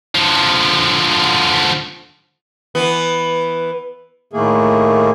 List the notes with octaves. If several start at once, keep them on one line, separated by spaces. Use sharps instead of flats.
D3 F3
E3 B3
A2 D#3 A3 A#3 G#4